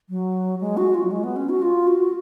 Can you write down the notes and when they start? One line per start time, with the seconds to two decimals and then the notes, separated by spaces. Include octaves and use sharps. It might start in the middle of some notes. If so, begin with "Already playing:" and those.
0.09 F#3
0.60 G#3
0.77 F#4
0.94 F4
1.03 F#3
1.11 G#3
1.24 B3
1.36 C#4
1.49 F#4
1.62 F4
1.87 F#4